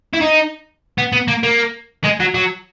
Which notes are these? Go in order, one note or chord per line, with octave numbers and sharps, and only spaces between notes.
E4
D#4
B3
B3
A#3
A#3
G#3
F#3
F#3